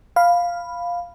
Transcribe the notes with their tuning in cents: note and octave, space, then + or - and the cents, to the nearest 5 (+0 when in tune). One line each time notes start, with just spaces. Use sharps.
F5 +0 B5 +0